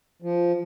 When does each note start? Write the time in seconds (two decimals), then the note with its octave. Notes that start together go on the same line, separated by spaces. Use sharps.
0.22 F3